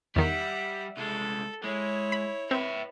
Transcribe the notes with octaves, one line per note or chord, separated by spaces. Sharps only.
E2 D#3 G3 E5 F#5
C2 G#3 A4
G#3 E4 C#5
B5
C4 B4 C#5 E5